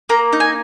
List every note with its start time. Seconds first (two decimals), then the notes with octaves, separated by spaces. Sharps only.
0.09 A#3 A#5
0.33 D#4
0.40 G#5